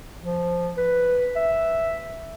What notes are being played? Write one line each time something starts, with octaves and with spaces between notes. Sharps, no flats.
F3
B4
E5